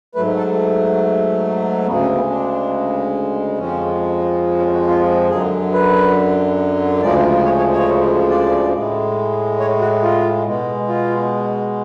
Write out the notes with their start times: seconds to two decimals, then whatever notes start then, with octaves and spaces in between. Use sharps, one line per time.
0.15 G#2 F#3 A3 B4
0.37 A4
1.86 D2 C#3 G#3 B3
2.02 C#4
2.15 B3
2.30 D4
3.58 F2 F3 G#3 C#4
4.59 C#4
4.73 F#4
4.87 F4
5.30 F#2 D3 F#3 G#4
5.73 B4
7.02 D2 C#3 F3 G#3 D5
7.45 C#5
7.58 C#5
7.73 C#5
8.30 D5
8.73 A2 G#3
9.60 C#5
9.81 F#4
10.03 F4
10.45 B2 G#3
10.88 F4